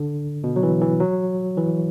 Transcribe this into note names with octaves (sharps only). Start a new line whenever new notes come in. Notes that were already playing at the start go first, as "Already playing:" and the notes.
Already playing: D3
B2
F#3
E3
E3
F#3
E3